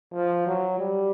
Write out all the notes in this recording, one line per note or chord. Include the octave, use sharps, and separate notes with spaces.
F3
F#3
G3